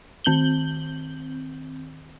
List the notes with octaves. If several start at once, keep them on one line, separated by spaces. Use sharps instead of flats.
D#3 C4 G6 F#7 G7